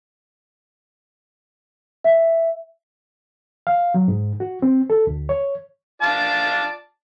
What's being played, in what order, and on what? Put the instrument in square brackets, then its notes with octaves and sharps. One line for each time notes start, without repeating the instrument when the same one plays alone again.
[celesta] E5
[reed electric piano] F5
F#3
G#2
F#4
C4
A4
D2
C#5
[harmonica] F4 D5 A5